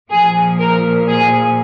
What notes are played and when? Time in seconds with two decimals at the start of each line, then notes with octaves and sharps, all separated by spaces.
0.10 A#2 F3 G#4
0.59 A#4
1.08 G#4